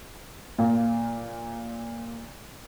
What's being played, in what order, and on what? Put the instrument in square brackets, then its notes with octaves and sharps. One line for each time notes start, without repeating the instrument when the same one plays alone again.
[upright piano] A#2 A#3